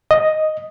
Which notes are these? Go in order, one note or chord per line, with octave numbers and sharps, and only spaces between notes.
D#5